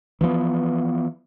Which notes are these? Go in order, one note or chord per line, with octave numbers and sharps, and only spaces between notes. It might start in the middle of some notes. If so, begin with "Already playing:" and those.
E3 F3 G#3 B3